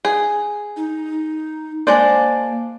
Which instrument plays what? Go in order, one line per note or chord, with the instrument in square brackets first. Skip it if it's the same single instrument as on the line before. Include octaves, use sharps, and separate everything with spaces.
[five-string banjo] G#4
[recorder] D#4
[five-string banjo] G#3 D4 C5 [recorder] A#3 [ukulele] D5